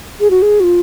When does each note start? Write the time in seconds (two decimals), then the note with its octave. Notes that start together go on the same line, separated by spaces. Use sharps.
0.20 G#4
0.30 F#4
0.42 G#4
0.60 F#4
0.64 F4